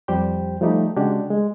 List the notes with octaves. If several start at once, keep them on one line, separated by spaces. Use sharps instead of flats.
F2 G3 G4 C5 G5
F3 G3 A3 D#4 G4
C#3 G#3 D4 F#4 G4
G#3